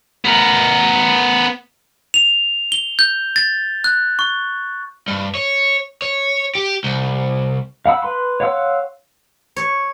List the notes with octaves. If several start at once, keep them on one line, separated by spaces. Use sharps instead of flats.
B3 A#4
F7
G7
G6
A6
F#6
C#6
G2
C#5
C#5
G4
C2
F5 F#5 B5 E6
B4 B5 C6
C#5 F5 F#5 C6 E6
C#5